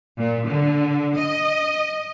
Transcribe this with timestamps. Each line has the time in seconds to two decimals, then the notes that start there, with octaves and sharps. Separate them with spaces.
0.17 A#2
0.47 D3
1.17 D#5